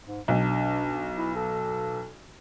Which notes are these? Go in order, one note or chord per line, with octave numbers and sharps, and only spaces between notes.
G#2
B1 D4
E4
A4